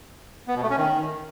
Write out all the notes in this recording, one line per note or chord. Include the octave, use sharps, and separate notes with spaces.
B3
B2
A3
C#4
D#3